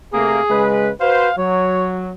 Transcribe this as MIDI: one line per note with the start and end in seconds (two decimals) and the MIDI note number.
0.13 0.40 48
0.13 0.40 57
0.13 0.40 58
0.13 0.66 68
0.50 0.91 49
0.50 0.91 56
0.50 0.91 71
1.01 1.30 66
1.01 1.30 71
1.01 1.30 72
1.01 1.37 77
1.38 2.12 54
1.38 1.94 73